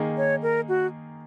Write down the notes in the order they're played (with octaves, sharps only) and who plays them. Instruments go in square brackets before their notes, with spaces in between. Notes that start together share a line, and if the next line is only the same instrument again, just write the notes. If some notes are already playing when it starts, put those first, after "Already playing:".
Already playing: [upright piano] D#3 A#3 D#4 G#4
[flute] C#5
A#4
F#4